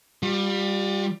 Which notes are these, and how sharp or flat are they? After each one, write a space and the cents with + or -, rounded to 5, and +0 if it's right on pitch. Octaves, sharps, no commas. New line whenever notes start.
G3 +10 F4 +45